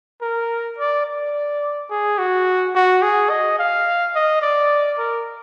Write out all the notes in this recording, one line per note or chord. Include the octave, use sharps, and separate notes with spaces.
A#4
D5
D5
G#4
F#4
F#4
G#4
D#5
F5
D#5
D5
A#4